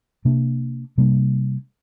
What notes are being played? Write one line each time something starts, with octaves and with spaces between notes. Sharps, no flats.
C3 A#3 D4
C3 G3 A#3 D4